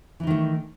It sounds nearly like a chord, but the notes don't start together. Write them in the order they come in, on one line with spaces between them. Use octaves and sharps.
E3 D#4 D#3 A3